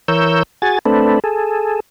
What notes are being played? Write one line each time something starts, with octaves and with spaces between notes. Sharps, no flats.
E3 A#4 C#5 E6 G6
F#4 G#4 G#5 A6
A3 C4 D4 A4 B4
G#4 A4